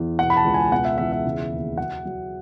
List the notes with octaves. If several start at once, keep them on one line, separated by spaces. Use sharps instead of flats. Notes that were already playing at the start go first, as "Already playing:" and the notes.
Already playing: E2
B2 F#5
B5
A5
C#2
G#5
B2 F#5
E5
E2 E5
E5
C#3
D#2
F#3 F#5
F#3